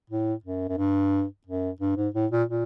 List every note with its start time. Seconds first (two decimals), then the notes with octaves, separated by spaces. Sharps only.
0.10 A2
0.44 F#2
0.69 F#2
0.77 G2
1.46 F#2
1.80 G2
1.96 G#2
2.14 A2
2.31 A#2
2.48 A#2